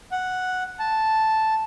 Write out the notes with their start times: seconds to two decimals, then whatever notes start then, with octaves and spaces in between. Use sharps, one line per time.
0.12 F#5
0.79 A5